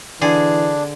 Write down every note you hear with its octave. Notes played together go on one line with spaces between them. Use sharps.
D3 E3 D4 G#4